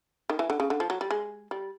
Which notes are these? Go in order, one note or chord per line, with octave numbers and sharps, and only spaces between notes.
D#3
E3
D3
C#3
D3
F3
F#3
G3
G#3
G3